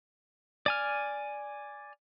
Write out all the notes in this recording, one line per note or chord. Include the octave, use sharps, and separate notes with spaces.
D5 G#5 F6